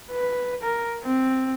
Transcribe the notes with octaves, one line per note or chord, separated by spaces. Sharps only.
B4
A#4
C4